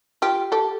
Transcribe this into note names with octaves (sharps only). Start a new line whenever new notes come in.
F4 G4
G4 A4